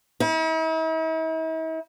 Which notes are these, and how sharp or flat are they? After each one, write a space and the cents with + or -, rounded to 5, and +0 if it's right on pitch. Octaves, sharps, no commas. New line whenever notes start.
E4 -45